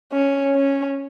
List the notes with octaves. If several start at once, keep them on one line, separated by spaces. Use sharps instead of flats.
C#4
C#4